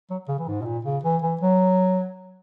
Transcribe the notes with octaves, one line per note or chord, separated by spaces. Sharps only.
F#3
C#3
E3
G#2
B2
A#2
C#3
E3
E3
F#3